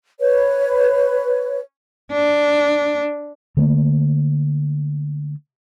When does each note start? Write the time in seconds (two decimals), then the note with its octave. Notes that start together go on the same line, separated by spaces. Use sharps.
0.20 B4 C#5
2.12 D4
3.57 D3 A3 A#3